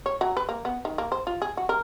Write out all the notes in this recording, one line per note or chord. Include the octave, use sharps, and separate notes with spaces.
C#5
F#3
B4
A#3
B3
D#3
A#3
C5
F4
G#4
F#4
A#4